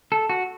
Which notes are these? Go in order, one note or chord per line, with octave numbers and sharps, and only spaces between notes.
A4
F#4